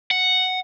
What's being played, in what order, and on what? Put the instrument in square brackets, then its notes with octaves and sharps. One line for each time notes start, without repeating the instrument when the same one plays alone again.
[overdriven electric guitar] F#5